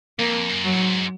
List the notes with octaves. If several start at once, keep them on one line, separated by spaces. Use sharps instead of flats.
F2 A#3
F#2
F#3
A2
G#2